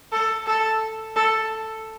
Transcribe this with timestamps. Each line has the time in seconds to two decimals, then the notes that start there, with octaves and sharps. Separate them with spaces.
0.12 A4
0.46 A4
1.16 A4